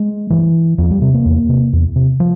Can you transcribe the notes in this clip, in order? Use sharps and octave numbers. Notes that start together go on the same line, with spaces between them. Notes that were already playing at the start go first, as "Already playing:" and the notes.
Already playing: G#3
G2 E3
E2 F3
G3
C3 C4
A#3
E2
C3
E2
C3
F3